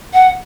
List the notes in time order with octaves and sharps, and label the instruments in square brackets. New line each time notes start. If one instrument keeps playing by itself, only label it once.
[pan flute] F#5